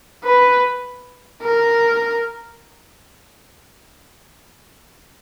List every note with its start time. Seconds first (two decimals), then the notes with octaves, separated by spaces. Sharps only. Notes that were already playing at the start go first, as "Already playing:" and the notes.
0.23 B4
1.43 A#4